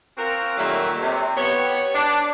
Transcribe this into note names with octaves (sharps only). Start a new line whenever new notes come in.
C4 F4 F#4 A#4
A#2 D#3 F#3 G3 A3
C3
B3 G4 C#5
D4